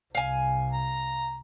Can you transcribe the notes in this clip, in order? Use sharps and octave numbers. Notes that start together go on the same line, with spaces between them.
C2 F5 G#5
A#5